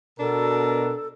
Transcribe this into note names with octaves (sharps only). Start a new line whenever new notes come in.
B2 D4 A4 A#4